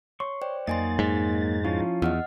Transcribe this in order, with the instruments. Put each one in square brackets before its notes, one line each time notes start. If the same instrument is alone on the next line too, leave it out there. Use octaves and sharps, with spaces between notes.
[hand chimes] C#5 [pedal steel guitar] C6 C#6
[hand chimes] C5 D5 G5
[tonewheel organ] F2 A6 [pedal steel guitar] F#3 A#3 D#4 [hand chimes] D#5 G#5 C6
[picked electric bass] G#2
[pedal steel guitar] F3 C#4 F4 [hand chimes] E4
[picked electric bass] E2 [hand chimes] D#5 F#5 F6